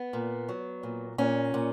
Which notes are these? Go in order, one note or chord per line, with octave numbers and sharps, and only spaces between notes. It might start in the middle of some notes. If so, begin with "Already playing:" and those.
Already playing: B3
A#2
F#3
A#2
A#2 C#4
A#2